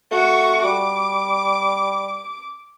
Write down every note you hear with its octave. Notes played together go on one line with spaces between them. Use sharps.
A3 F#4 C#6
G3 D6